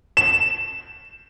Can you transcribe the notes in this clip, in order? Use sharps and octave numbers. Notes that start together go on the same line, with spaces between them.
E7